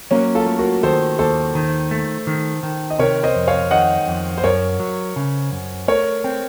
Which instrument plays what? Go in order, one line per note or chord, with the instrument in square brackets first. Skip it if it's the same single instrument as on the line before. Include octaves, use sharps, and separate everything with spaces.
[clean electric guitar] F#3 [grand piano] A#3 C#4
[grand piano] F4 A4
[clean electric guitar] A3
[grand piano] F#4 A#4
[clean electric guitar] D#3 [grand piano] A4 C5
[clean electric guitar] D#2 [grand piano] A4 C5
[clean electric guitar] D#3
A3
D#3
D#3
[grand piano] D#5
[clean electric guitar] C3 [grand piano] A#4 C#5
[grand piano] C5 D#5
[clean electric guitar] F2
[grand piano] C#5 F5
[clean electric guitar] D#3 [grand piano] D#5 F#5
[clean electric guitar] F2
[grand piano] C5
[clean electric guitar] F#2 [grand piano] A#4 C#5
[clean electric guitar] F#3
C#3
F#2
[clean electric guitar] A3 [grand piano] A#4 C#5
[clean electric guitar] C4